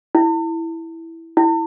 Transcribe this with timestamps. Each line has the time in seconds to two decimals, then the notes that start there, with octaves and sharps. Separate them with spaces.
0.15 E4
1.37 E4